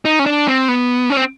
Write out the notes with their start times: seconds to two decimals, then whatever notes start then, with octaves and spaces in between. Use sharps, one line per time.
0.05 D#4
0.19 C#4
0.26 D4
0.48 C4
0.68 B3
1.10 C#4
1.17 C4